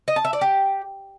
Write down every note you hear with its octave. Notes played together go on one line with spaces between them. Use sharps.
D#5
A5
E5
D5
G4